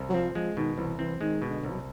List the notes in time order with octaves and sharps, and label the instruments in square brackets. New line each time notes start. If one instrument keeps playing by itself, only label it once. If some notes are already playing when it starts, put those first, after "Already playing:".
Already playing: [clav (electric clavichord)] C2
[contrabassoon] F#3
[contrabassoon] F3 [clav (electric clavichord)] C4
[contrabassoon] F3 [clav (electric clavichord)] G#3
[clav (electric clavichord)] B2 [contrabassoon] D#3
[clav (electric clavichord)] C2 [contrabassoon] E3
[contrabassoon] E3 [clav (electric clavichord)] C4
[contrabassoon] D#3 [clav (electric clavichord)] G#3
[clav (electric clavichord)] B2
[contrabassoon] D3
[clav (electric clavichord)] C2
[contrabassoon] F#3